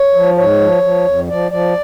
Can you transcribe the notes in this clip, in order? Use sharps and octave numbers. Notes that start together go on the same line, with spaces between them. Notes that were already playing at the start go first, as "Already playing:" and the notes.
Already playing: C#5
F3
G#2 C#5
F3
F3
F2
F3 D5
F3 D5